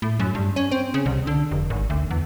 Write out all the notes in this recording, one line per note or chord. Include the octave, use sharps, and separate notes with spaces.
A2
F#2
G2
C#4
C4
C#3
C2
D3
F1
G#1
D2
E2